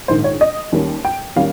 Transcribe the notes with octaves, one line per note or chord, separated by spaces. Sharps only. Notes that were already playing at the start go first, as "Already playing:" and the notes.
A#1 G#2 D#3 C5
C#5
D#5
D#2 D#3 G3 A#3 C#4
G5
D#3 G3 A#3 C#4 F5